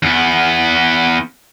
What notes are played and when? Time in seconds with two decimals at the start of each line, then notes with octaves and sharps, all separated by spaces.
0.03 E2 B3